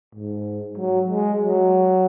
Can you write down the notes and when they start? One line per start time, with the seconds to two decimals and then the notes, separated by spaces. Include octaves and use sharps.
0.15 G#2
0.78 F#3
1.10 G#3
1.41 F#3